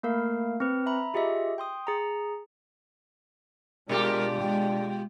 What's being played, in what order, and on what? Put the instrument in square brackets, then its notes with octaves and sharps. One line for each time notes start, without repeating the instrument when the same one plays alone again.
[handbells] A3 A#3 A#4 F5
C4 B4
E5 A#5 B5
F4 G4 G#4 D#5 E5
G5 C6 D#6
G#4 A#5
[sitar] B2 F4 G4 [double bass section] G#3 [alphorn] D4 [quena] A#4
[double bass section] G#3 [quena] G5